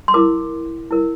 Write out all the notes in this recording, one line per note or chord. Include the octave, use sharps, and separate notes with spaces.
C6
E4 A#4 D6
E4 A#4